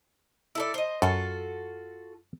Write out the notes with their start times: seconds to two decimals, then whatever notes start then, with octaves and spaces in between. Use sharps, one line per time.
0.55 E4 A4 D5
0.74 C5 D#5
1.02 F#2 F4 F#4 A4